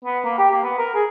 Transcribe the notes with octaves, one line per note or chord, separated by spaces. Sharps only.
B3
A#3
G4
A#3
B3
A#4
G#4